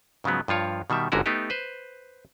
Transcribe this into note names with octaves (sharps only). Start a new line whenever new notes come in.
G#2 C#3 F3 F#3 B3
G2 F3 F4 C#5
B2 D#3 G3 E5
G1 G#2 D3 C#4 F#4 A#4
A3 B3 D#4 G4
B4 C5